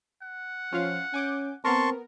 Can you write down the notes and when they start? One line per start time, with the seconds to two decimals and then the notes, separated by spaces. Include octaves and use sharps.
0.23 F#5
0.73 F3 C#4 F4 F5
1.14 C#4 G#5 D6 G6
1.65 B3 C4 A#4 A5 C6 C#6